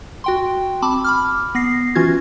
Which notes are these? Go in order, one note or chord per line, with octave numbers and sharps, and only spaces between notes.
F#4 G5 C6
C4 A5 B5 D6
B5 D6 F6
B3 A#6 C7
E3 C#4 F4 F#4 G#6